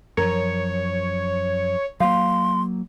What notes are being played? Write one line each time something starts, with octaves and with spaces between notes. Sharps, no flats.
F#2 F3 A#4 C#5
F#3 A#3 F5 C6